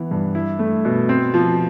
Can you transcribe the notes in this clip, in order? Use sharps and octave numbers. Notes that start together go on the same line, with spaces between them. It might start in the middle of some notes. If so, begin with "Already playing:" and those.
Already playing: E3 B3
G2
E4
A3
B2
C4
F3